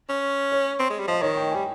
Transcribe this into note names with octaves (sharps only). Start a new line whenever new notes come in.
C#4
C#5
C4
G#3
G3
F3 D#5
D#3 C#5
G5
G#5
G3